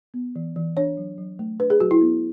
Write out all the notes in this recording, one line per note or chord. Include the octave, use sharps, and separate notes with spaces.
B3
E3
E3
D4 C#5
F#3
F#3
A3
D4 B4
G#4
F#3 F#4
E4
B3